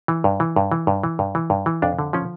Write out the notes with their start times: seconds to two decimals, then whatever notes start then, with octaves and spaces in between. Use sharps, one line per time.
0.08 E3
0.24 G2
0.40 E3
0.56 G2
0.71 E3
0.87 G2
1.03 E3
1.19 G2
1.35 E3
1.50 G2
1.66 E3
1.82 F2 D4
1.99 D3
2.13 F3 C#4